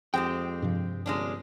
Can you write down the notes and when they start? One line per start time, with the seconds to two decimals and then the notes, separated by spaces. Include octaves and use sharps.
0.14 F2 G#3 C4 G4 G5
0.62 G2 C3 F3
1.06 G1 G#3 C#4 D4